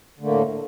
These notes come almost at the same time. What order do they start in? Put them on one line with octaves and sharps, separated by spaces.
D3 A3 A#3 A2